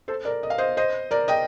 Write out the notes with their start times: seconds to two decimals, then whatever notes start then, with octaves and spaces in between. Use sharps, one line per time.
0.08 A4 C5
0.25 A#4 D5
0.43 D#5
0.50 F5
0.58 C5 D#5
0.77 C5 D#5
1.11 A#4 D5
1.28 D#5 G5